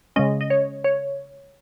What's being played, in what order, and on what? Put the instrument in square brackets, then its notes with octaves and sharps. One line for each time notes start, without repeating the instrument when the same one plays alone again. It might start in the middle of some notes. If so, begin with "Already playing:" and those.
[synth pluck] C#3 G#3 C#4 D#5
D#5
C#5
C#5